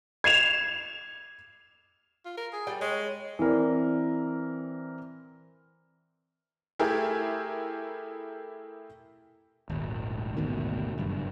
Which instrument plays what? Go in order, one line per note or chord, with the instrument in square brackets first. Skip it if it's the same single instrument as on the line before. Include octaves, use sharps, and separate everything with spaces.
[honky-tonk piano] G#6 C7 E7 F7
[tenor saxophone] F4
A#4
G#4
[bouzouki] G3 D5 G5
[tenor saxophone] G#3 [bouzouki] C#5
[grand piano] E3 C4 A#4 D5
[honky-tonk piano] A3 E4 G4 G#4 A#4
[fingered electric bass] D#1 G#1
G#1 D2 B2 D#3
F#1 G2